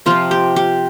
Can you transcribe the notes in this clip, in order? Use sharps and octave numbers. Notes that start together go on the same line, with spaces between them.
C3 F3 C4 F4
G4
G4